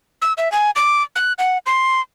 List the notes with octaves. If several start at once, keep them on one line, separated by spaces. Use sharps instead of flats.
E6
E5
G#5
D6
F#6
F#5
C6